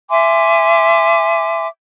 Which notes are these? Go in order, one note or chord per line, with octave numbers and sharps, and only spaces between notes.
E5 G#5 C6 D6